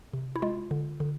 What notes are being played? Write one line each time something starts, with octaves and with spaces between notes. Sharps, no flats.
C3
E4
G#3 F4
D3
D3